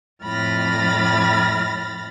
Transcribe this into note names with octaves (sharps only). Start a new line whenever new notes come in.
F2 A2 B5 F6 A6 A#6